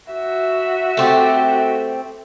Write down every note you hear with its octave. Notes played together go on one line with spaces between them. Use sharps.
F#4 E5
A3 C4 G4